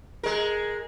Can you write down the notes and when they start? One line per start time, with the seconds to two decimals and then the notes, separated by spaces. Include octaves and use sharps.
0.23 G#3 A#4